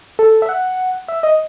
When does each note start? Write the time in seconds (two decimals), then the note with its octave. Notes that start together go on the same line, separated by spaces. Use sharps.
0.19 A4
0.42 E5
0.49 F#5
1.08 E5
1.23 D#5